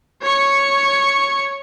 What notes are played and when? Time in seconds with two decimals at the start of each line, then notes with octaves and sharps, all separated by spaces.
0.22 C#5 C#6